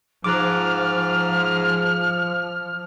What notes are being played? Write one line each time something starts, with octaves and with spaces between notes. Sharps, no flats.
G#2 F3 D6 F6 F#6